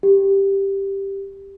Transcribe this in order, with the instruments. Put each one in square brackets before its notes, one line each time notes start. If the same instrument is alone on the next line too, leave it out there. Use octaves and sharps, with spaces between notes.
[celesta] G4